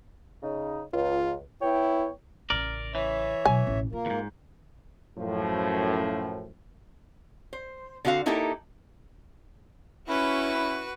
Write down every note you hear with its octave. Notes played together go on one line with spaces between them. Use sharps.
C#3 D#4
C#2 F4
B3 E4 C#5 G5
A1 C#3 A#4 D5
E3 C#5 E5
B2 F#3 G#5
A1 D2
A#3 F4 A#4
E2 G#2
F#2 A2 F3
C5
D3 C4 F#4 D5 F5
A#3 D#4 E4 G4 A4 A#4
C#4 E4 F#4 B4